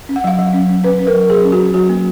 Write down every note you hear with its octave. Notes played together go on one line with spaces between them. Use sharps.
C#4
F#5
F#3 F5
F#3
C#4
C#4
C#4 B4
C#4
A#4
F#3
F#3 G#4
C#4
F#4
C#4
F#3 F#4
A#3